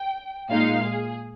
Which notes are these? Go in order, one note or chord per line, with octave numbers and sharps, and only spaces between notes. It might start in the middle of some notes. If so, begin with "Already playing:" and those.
Already playing: G5
A#2 G#3 D#4 F5
G#4